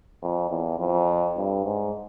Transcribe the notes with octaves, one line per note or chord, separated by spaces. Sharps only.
F2
E2
F2
G2
G#2